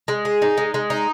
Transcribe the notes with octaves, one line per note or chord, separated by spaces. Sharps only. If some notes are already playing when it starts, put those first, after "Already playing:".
G#3
G#4
D#4
G#3
G#3
D#4